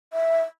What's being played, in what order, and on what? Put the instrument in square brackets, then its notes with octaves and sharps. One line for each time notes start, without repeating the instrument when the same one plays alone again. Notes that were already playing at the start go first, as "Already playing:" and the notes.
[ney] E5